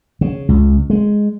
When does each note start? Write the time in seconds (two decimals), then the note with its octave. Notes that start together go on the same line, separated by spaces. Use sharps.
0.21 C#3
0.49 C#2
0.90 G#3